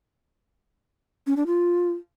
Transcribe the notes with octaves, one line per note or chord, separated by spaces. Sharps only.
C#4
D4
F4